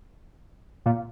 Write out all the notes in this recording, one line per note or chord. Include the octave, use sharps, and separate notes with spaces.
A#2